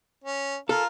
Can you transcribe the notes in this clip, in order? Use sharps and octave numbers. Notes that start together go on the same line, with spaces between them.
C#4
F4 A4 A#4 F5